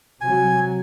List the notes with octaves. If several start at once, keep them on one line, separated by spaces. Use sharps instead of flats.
C3 F#3 G#5